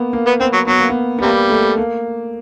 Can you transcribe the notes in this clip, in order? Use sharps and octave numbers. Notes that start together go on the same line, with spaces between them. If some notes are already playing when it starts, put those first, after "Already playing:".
Already playing: A#3 B3
A#3
B3
B3 C4
F#3
F#3 B3
A#3
B3
B3
C3 G3 A#3
A3
A#3